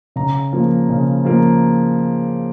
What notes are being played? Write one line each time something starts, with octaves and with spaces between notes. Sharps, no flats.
C#3 A#5
F3 A#3
C#3
F3 A#3